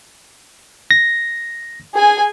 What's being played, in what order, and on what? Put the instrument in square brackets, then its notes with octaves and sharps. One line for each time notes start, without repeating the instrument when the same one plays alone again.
[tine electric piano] A#6
[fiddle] G#4 G#5